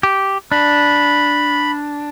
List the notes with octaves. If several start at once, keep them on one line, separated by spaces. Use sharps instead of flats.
G4
D4 B5